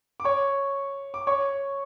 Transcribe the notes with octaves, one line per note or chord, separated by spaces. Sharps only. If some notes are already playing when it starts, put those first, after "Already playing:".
D6
C#5 C#6
D6
C#5 C#6